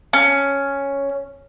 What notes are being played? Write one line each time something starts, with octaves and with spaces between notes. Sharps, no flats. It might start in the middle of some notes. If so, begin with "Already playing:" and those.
C#4